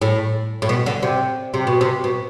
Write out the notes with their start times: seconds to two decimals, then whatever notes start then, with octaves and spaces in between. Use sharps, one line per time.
0.02 A2
0.62 A2
0.69 B2
0.86 D3
1.03 C3
1.54 C3
1.67 B2
1.81 C3
2.04 B2